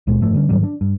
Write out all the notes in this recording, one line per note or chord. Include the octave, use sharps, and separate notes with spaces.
C#2 A#2 G#3
F#1 G#2 F3 A3
D3 G3 C#4
G#2 D#3 F#3 G3
D4
G2